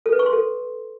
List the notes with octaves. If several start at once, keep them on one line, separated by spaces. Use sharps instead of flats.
A4
B4
C#6
C6
A4